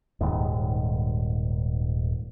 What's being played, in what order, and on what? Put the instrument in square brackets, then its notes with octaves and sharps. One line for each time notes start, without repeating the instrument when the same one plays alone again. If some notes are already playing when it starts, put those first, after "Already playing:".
[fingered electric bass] D#1 G#2 D#3